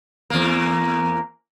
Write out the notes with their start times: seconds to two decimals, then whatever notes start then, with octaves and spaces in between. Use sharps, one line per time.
0.30 E2 A#3